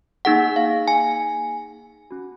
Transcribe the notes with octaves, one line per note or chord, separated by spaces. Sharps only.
A#3 D#4 G#4 F#5
F5
G#5
C#4 F#4